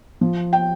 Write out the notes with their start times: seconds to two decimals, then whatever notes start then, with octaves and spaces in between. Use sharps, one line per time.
0.21 F3
0.53 G5